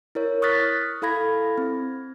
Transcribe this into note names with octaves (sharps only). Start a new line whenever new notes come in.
E4 A#4 C#5
C#6 D#6 F6 F#6 A6 B6
E4 A4 F5 B5 G#6 A#6
C4